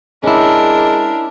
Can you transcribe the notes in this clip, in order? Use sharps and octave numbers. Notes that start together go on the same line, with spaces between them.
G#3 C#4 D4 E4 A#4